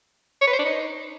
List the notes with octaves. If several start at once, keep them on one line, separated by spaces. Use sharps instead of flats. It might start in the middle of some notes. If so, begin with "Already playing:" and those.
C#5
B4
C5
D4
D#4